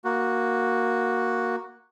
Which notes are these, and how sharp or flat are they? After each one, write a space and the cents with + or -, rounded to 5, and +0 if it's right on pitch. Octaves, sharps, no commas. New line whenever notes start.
A#3 +5 F#4 +0